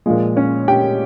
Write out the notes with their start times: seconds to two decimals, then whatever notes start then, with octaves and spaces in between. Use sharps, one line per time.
0.06 A#2 F3 G#3
0.36 C#4 C#5
0.68 G4 G5